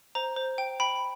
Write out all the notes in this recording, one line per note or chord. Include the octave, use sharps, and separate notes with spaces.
C5 A#5
C5
G5
G5 B5